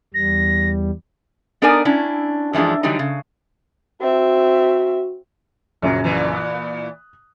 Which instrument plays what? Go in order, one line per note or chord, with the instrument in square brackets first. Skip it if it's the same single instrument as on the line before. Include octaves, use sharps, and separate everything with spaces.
[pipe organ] E2 G3 [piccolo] A#6
[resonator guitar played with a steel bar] B3 D4 D#4 A#4 D5 G#5
C#4 D4 E4
F#2 E3 F3 G#3 D4
D3 E3 F#3 G3 D#4
C#3
[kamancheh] C4 E5 [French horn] F#4
[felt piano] A#1 F#2 C#3 [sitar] F#3
[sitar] A#2 E3
[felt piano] D#6 F#6